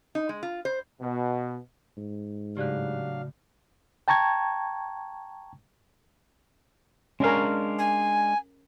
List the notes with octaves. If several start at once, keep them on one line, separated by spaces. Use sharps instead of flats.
D#4
G#3
F4
C5
B2
G#2
A2 C#3 F#3 D4 G4 D5 F5 F#6
G5 A5 A#5 C#6 G#6
G#3 C#4 D4 A#4 F5
G#5